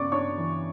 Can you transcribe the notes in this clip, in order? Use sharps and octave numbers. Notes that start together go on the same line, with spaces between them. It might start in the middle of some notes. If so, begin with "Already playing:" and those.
Already playing: C#3 B3 D5 C#6 D6
D4 C#5 C#6
E3